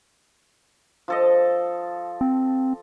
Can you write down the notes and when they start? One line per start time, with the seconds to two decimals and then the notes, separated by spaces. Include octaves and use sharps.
1.08 F3 A4 D#5
2.21 C4